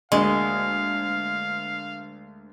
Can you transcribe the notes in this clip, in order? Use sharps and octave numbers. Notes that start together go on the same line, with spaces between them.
D2 G#3 A#3 F5 D#6